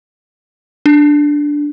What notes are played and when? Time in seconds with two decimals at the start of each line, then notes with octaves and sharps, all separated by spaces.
0.86 D4